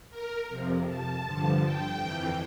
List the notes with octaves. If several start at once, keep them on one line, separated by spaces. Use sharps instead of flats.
A#4
F2 C3 F3
A5
G2 D3 F3
G5
F2 E3